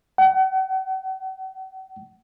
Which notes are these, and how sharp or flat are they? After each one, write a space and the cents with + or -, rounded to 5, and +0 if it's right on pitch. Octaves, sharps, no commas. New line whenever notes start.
F#5 +35